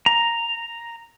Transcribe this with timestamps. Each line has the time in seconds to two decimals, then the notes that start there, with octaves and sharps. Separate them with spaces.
0.06 A#5